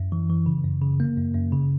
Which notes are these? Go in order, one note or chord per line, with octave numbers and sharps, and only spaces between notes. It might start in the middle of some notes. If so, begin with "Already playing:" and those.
Already playing: F#2
E3
E3
C#3
F#2
C#3
A#3
F#2
F#2
C#3